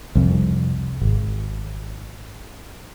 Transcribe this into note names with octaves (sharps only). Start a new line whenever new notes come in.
C2 F2
G#1